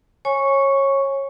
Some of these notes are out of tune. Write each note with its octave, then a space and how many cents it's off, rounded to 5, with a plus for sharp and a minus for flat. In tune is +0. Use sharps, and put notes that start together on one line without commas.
C#5 -20 G#5 +0 C#6 +0